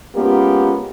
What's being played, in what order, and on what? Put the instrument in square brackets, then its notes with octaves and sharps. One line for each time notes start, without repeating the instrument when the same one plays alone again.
[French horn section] G#3 A#3 B3 C#4 F4 G4